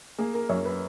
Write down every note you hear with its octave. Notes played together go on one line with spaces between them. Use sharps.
A#3 G#4
A#4
F#2 C#5
B4